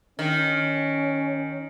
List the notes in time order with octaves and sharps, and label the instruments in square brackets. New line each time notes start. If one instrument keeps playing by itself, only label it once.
[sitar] D#3 [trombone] C#4